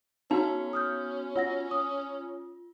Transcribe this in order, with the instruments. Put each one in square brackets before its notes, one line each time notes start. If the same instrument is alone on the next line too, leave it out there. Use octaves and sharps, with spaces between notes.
[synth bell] B3 F#4 [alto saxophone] C#4 [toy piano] D#4
[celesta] D#6 F6 G6
[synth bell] F4 [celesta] C#5 F#5 A#6
[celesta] D#6